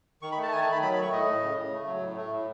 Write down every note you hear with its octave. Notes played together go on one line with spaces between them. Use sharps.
D#3 C#6
B5
A3 A5
A5
D#3 G#5
A5
D#3 B5
F#3 B5
B5
A3 C#6
A2 D#5
A2
C#3
C#3
A3
F#3
A2
A3
A2